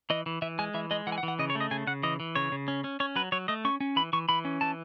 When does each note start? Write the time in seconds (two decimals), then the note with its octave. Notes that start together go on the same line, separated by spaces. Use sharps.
0.10 E3 D#5
0.26 E3
0.42 E3 E5
0.59 G#3 G#5
0.74 E3 E5
0.91 G#3 D#5
1.07 E3 F#5
1.12 G#5
1.18 F#5
1.23 E3
1.28 F#5
1.39 C#3 D#5
1.50 C#5
1.55 A3
1.61 D#5
1.71 C#3 G#5
1.87 C#3 F#5
2.03 E3 D#5
2.20 E3
2.35 C#3 C#5
2.52 C#3
2.68 C#4
2.84 C#4
3.00 C#4 C#5
3.16 F#3 B4
3.32 F#3 C#5
3.48 A3 D#5
3.65 C#4 C#6
3.80 C#4
3.96 E3 B5
4.13 E3 C#6
4.29 E3 B5
4.45 C#4
4.61 E3 A5